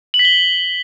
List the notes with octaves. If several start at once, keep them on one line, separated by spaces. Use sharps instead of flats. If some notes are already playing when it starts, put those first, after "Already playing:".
F#7
B6
G7